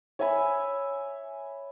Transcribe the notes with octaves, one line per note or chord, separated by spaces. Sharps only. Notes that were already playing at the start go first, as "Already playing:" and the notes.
C#5 E5 G#5 B5